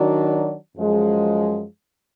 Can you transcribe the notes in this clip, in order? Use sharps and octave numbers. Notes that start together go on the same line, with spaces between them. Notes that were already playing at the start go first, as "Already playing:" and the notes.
Already playing: D#3 F#3 D4 F#4 D5
F#2 F3 G#3